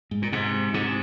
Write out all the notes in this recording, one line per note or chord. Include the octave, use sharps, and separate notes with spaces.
G#2
A#2
G#2 C3
G#2 C3